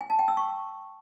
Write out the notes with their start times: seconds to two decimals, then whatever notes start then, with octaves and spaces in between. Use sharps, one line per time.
0.01 G#5
0.10 A5
0.19 G5
0.28 E6
0.37 C#6